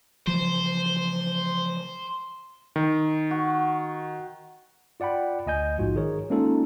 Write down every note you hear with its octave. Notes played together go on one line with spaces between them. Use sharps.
C#3 E3 F3 C5
D#3
F#4
F4 D5 F#5 G5 B5
D2 D#5 G#5 G6
A#1 G#2 F4 F#4
D#3 G#4 A#4 C#5
G#3 A#3 C#4 D#4 F4 A4